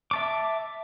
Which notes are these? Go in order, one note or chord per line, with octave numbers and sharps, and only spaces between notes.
E5 A5 D6